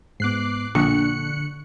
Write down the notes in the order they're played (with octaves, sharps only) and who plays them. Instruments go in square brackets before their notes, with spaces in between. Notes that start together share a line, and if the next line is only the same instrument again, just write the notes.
[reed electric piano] G#2 B3 [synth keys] D6 F#6 C7
[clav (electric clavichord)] A#1 [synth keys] D3 F#6 C#7 [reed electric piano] C#6